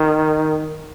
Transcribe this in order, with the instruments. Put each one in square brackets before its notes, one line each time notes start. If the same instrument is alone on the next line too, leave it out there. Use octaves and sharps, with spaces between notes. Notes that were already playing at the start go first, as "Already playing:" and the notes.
Already playing: [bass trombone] D#3